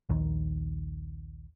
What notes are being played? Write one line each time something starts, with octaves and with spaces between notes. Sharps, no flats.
A#1 D#2 D#3